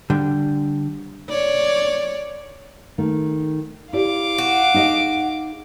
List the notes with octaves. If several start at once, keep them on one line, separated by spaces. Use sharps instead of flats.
D3 G3
C#5 D5
D#3 A3
E4 G4 D5 F5 D6
F#4
D#4 G#4 D#5